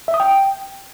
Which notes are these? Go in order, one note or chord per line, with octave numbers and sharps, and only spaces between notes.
E5
D#6
G5